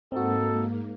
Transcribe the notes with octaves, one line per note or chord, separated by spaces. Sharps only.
G#2 A#3 C4 D#4 F#4 A4